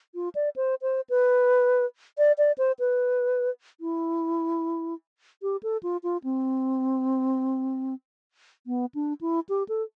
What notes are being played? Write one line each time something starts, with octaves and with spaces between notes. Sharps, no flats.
F4
D5
C5
C5
B4
D5
D5
C5
B4
E4
G4
A4
F4
F4
C4
B3
D4
E4
G4
A4